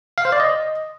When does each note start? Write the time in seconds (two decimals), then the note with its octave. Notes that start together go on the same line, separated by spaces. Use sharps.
0.18 F5
0.25 C5
0.32 D5
0.40 D#5